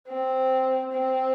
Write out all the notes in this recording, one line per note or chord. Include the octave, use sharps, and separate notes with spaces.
C4
C4